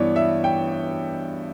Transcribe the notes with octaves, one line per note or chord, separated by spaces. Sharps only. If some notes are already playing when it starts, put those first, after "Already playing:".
Already playing: G2 E3 B3 C#5 D5
E5
G5